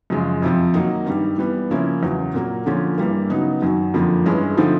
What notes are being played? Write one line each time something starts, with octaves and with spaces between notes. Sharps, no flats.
F#2 C#3 F3 G#3
F2 C3 F3
D#3 F#3 A#3 D#4
G2 D#3 G3
E3 G3 B3
C#3 F3 A#3 C#4 E4
E2 C#3 F#3
A#2 F#3 A#3
D3 F3 A#3 C#4
G2 E3 G3 A#3
C#3 F#3 B3 D#4
F#2 D#3 F#3
F2 D3 F3 A#3
G2 E3 G#3 C#4
D3 F3 A3 C4 D#4